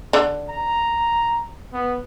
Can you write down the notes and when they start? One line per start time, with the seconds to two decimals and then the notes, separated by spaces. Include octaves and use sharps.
0.13 D3
0.49 A#5
1.73 B3